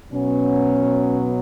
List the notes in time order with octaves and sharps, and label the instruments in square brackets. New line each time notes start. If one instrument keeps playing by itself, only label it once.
[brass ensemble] B2 F#3 B3 C#4